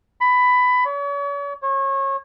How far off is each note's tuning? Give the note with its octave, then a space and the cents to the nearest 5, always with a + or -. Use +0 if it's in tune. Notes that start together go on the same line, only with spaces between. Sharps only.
B5 +15
C#5 +40
C#5 -30